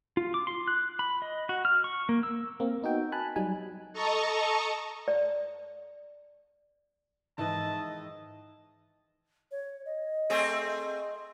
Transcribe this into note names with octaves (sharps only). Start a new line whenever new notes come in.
F4
D6
C6
F#6
B5
D#5
F#4
F6
C#6
A#3
E6
A#3 C4
B3 D#4 F#4 G5
G#5 A5 B5 F#6
F#3 G3 D#4 G#5
A4 D#5 A5 A#5 C#6
D5
G#2 D#3 E3 E4 B4 D#5 A5
C#5
D#5
A3 C4 G#4